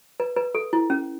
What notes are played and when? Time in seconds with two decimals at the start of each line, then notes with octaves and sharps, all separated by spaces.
0.20 B4
0.36 B4
0.55 A4
0.73 E4
0.90 C#4